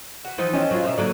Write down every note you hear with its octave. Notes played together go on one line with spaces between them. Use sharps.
F#4 B4
E3 F3 D#4
C#4 A4 D#5 G5
F#3 F4
B2 F3 A#4 C5 E5
D3 F#3 A#3 D5